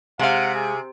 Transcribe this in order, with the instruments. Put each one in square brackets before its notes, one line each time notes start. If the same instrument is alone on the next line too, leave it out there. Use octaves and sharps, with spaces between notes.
[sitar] C3 [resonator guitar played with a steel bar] G#3 F5 [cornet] F#5
[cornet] G#4